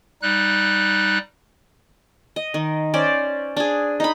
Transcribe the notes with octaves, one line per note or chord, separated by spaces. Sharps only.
G3 D#4 F#6
D#5
D#3
C#4 C5 D5
D4 G#4
D#4 B5